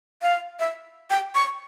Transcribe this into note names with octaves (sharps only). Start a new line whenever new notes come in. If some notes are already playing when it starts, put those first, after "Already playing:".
F5
E5
G5
C#6